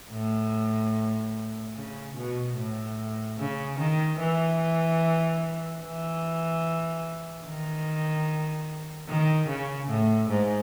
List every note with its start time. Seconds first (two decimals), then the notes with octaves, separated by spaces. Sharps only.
0.12 A2
1.75 C#3
2.16 B2
2.57 A2
3.38 C#3
3.79 D#3
4.20 E3
5.82 E3
7.45 D#3
9.09 D#3
9.49 C#3
9.89 A2
10.30 G#2